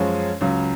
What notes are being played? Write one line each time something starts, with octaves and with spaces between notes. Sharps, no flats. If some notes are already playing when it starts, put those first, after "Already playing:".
Already playing: F#2 F3 G#3 C#4
C#2 C#3 F#3